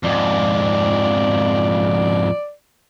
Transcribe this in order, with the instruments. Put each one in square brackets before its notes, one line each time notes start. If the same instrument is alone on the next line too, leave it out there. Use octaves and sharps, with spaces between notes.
[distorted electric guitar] F2 G#2 [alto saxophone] D5